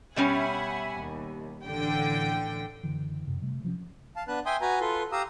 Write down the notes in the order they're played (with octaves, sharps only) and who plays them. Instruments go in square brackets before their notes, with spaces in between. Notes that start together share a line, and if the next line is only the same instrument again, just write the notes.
[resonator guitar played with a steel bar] B2 G3 C#4 [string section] E5 F#5 G#5
[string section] D#2
A1 D3 G5
[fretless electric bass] F#1 D3 E3
F#2 C3
C3 G3 A3
C3 F3 C4 C#4
[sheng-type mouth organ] F5 A5
B3 D4 B4 A5 F#6
E5 G5 G#5 C6 D#6
F#4 B4 G#5 A#5
F4 A4 B4 C6
G4 F5 A#5 D#6 E6